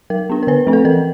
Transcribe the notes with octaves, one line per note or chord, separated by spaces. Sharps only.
F#3 A#4
B3 D4
A#4
D3 B4
F3 A3 C4
A4
E3 A#4